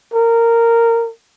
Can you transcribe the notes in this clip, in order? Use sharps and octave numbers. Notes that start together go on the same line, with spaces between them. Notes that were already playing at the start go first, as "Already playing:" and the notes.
A#4